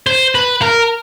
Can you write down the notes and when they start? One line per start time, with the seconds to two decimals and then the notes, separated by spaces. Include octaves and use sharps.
0.07 C5
0.35 B4
0.62 A#4